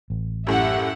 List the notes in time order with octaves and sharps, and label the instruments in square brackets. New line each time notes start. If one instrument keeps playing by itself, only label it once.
[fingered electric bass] A1
[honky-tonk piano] F#2 A2 [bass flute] G4 [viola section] E5 F#5